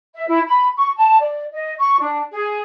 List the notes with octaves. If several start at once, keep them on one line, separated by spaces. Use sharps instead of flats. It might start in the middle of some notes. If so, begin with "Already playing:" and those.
E5
E4
B5
C#6
A5
D5
D#5
C#6
D4
G#4